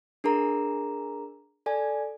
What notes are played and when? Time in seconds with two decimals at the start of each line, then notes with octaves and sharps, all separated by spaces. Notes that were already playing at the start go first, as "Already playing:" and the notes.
0.24 D4 G#4 A#4 A#5
1.66 A4 D5 G#5